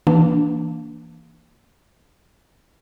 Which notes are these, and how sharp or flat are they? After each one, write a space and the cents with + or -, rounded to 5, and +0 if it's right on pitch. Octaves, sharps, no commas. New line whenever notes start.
E3 -5 A#3 +0 D4 +0